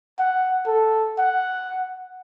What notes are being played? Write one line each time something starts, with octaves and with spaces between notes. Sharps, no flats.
F#5
A4
F#5